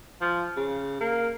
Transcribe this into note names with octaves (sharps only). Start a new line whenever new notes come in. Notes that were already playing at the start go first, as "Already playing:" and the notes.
F3
C#3
A#3